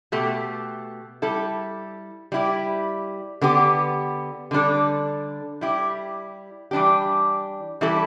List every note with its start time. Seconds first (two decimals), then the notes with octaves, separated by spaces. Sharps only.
0.12 B2 A3 G4
1.22 G3 E4 A4
2.32 G3 E4 G4
3.41 D3 B3 G4
4.51 D3 G3 D4 A4
5.61 G3 E4 G4
6.71 E3 G3 D4 G4
7.81 E3 G3 E4 A4